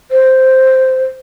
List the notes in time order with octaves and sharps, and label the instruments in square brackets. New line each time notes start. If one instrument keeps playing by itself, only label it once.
[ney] C5